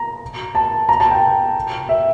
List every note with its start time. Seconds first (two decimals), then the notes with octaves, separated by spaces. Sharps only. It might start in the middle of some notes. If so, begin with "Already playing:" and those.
Already playing: A#5
0.55 A5
0.89 A#5
1.00 A5
1.11 G5
1.89 E5